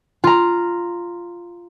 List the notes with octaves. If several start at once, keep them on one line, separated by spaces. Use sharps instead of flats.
F4 A#5